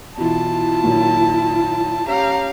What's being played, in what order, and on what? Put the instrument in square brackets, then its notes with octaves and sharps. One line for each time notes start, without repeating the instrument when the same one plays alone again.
[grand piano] B2 E3 [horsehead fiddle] E4 F4 [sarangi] A5
[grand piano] A#2 D#3 F#3
[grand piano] C#4 [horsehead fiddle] G4 F5 [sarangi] A#5